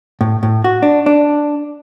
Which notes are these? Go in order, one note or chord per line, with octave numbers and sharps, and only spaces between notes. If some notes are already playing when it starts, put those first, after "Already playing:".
A2
A2
F#4
D4
D4